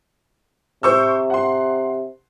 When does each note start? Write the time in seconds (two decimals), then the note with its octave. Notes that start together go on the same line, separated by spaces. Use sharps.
0.83 C3 C5 C#6 E6
1.30 F#5 C6